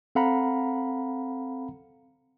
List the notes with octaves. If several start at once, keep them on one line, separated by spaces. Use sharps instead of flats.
C4 A4 F5 F#5 A#5 B5